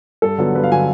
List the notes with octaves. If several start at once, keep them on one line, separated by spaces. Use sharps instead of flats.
G2 A4
D3 F#3 B3
G2 B4
F5
D3 F#3 B3 G#5